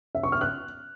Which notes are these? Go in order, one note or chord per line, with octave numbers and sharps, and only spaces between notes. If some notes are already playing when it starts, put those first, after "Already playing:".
E5
C#6
F6
F#6